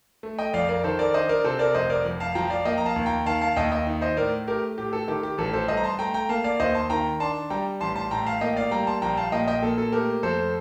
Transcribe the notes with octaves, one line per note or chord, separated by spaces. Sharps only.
A3
D#5 G5
F2 D5 F5
A#4 D5
D#3 A4 C5
A#4 D5
D4 C5 D#5
A#4 D5
C3 A4 C5
A#4 D5
F1 C5 D#5
A#4 D5
F2
F5 A5
F3 G5 A#5
D5 F5
A#3 D#5 G5
A#5
F5 A5
D#2
G5 A#5
D#3 F5 A5
F5 A5
D#2 D#5 G5
D#5 G5
D#4
C5 D#5
A2 A#4 D5
A3 G4 A#4
A2 G4
A4
D#3 G4
G4
A1 A4
A4 C5
G2 C5 D#5
A#5
A5 C6
A3 G5 A#5
G5 A#5
A#3 F5 A5
D5 F5
D#2 C5 D#5
A5 C6
D#3 G5 A#5
D4 A5 C6
G3 G5 A#5
A1 A5 C6
A5 C6
A2 G5 A#5
F5 A5
A#3 D#5 G5
D5 F5
G3 G5 A#5
A5 C6
A#1 G5 A#5
F5 A5
A#2 D#5 G5
D#5 G5
A#3 A4
A4
A3 G4 A#4
F2 A4 C5